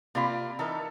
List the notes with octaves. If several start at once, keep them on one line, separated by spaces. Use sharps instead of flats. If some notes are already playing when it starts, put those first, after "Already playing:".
C3 A#3 F4 D5 B5
E3 D#4 A4 A#4 E5